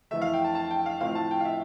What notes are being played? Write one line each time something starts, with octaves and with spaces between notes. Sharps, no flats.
F2 E3 A3 E5
F5
G5
A5
A5
G5
F5
A2 F3 A3 C4 F5
A5
G5
F5
E5